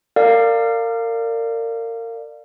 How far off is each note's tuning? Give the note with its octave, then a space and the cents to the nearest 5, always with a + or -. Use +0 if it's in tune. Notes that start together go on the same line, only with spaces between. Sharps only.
A#4 -30 D5 +20 F5 +0